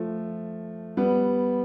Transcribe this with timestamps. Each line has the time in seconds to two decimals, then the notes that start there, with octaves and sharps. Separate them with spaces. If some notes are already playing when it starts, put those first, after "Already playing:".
Already playing: F3 A3
0.97 G3 B3